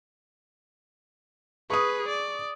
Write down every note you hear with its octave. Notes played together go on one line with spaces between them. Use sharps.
G#4 B4 C#6 D#6
D5